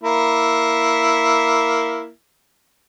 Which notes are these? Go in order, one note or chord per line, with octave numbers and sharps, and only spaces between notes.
A#3 E4